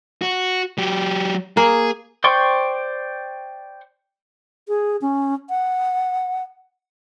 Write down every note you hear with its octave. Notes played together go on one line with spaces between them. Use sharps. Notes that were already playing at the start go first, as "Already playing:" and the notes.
F#4
F#3 G4
A#3 G#4
C5 D5 G5 C6 C#6
G#4
C#4
F#5